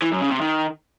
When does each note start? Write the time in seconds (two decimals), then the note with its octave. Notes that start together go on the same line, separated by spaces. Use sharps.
0.02 E3
0.12 F#2
0.21 C#3
0.31 C3
0.41 D#3